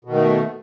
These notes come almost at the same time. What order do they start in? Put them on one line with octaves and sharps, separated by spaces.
B2 D#3 A3